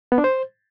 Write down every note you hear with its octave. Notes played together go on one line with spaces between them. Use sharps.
B3
D4
C5